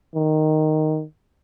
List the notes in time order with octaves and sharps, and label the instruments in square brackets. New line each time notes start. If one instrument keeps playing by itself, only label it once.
[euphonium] D#3